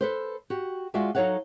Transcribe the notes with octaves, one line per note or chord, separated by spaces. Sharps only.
A4 B4 C5
F#4 G4
G#3 F4 F#4 D5 E5 G#5
F#3 D#4 A4 C#5 F5 F#5